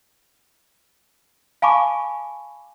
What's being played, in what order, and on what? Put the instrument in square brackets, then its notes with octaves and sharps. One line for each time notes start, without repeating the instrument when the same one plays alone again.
[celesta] F5 G#5 A5 B5 C#6 D6